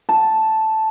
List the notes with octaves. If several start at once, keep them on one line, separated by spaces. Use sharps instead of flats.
A5